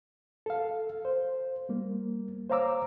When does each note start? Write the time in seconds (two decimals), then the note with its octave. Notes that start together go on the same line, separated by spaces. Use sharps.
0.46 A4 F5
1.05 C5
1.69 G3 A#3
2.50 C5 C#5 F5 A#5 D6 E6